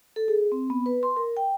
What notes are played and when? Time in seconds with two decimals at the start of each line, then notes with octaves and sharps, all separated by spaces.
0.16 A4
0.28 G#4
0.52 C4
0.70 B3
0.86 B4
1.03 C6
1.17 A#4
1.37 G5